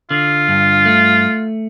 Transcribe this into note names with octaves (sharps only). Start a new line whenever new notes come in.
D3 F4
G2
A3